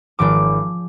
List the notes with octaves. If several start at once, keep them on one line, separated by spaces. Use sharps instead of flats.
G#1 G#2 F3 D6